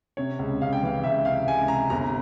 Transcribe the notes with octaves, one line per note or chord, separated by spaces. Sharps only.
C3 C#5
C#2
C#2 F5
G5
E3 F5
C#2 E5
C3 F5
C#2 G#5
C3 A#5
G1 A#5